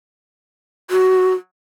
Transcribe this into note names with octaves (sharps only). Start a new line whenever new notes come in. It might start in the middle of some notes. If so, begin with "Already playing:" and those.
F#4